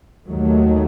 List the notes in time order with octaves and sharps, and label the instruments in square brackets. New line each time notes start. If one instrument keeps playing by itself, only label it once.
[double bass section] D#2 D#3 F#3 A3